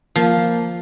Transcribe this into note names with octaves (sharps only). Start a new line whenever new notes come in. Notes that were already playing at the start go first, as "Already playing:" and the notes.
F3 A#3